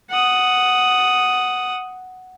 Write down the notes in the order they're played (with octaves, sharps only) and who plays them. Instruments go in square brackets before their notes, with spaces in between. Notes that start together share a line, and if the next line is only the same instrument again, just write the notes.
[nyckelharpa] F#5 D#6